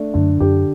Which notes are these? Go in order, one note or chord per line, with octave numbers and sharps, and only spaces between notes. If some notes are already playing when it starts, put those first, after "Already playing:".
Already playing: A3 D4
F#2 D3
F#2 G4